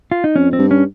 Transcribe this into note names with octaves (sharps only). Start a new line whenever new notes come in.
F4
D#4
F2 C#4
C4
G2
C#4